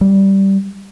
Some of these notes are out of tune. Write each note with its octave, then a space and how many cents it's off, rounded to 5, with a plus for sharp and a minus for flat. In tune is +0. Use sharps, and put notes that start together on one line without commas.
G3 -10